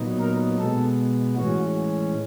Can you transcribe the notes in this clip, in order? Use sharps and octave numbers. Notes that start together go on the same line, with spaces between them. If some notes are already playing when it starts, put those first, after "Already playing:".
Already playing: A#2 F#3 B3 D#4
A#4
B2 G#3 B3 A4
A2 E3 G#3 C#4 F#4